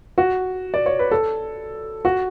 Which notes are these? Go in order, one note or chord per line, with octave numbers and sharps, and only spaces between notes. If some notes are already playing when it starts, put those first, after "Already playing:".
F#4
D5
C#5
B4
A4
F#4